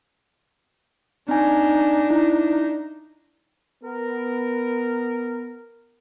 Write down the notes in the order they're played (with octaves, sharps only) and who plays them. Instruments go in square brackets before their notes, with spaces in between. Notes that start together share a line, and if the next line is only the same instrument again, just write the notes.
[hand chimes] C4 G#5 [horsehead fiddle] D4 D#4
[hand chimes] E4
[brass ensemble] B3 A#4